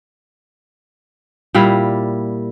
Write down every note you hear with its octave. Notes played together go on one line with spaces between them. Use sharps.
A#2 G3 E4 F5